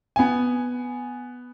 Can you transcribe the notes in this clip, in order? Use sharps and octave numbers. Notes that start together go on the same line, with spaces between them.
B3 G#5